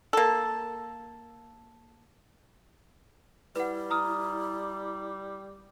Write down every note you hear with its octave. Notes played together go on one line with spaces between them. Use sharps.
A#3 A4
G3 E4 B4 F#5
A#5 D#6 F6